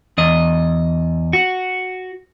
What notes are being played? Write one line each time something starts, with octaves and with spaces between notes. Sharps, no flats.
E2 D#5
F#4